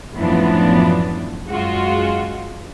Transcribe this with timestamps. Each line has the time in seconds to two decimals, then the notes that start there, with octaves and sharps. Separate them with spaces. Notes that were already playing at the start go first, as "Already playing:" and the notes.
0.17 F#2 A2 E3 F3 B3 D4
1.48 F#2 G#3 F4 F#4